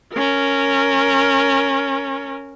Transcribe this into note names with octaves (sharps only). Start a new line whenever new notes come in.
C#4 A#4